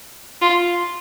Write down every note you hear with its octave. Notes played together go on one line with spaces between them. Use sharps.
F4